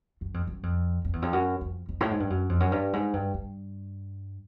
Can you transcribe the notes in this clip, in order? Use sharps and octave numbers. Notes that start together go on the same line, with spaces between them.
F#2
F2
F#2
F2
F2
E2
F2
F#2
F2
F2
A2
G#2
G2
F#2
F2
F#2
G2
G#2
G2
G2